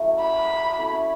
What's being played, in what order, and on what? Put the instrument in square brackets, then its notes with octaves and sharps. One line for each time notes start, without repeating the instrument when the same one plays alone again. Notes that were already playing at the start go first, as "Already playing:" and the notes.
Already playing: [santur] F#3 A3 C#4 E4
[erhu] B5
[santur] C#4 E4 A4 C#5